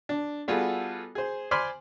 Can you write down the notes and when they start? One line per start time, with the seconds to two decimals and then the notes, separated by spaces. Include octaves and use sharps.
0.09 D4
0.48 G3 B3 F4 F#4 G#4 A4
1.15 G#4 C5
1.51 C5 D5 G#5 B5 C6 F6